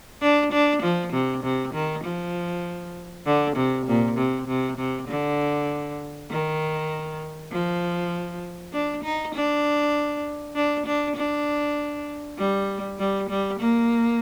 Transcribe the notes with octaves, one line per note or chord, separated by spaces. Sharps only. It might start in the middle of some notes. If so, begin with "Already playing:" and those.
D4
D4
F3
C3
C3
D#3
F3
D3
C3
A#2
C3
C3
C3
D3
D#3
F3
D4
D#4
D4
D4
D4
D4
G3
G3
G3
A#3